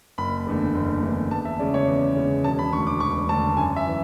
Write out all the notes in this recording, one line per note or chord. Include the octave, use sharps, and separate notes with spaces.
F#1 B5
E2 D3 A3
F#1
E2 D3 A3
E2 A5
E5
C#3 G#3 C#4 D5
C#5
E2
C#3 G#3 C#4
E1 A5
B5
D2 D3 C#6
D6
E1 C#6
D2 D3 A5
F#2 G#5
E5
E3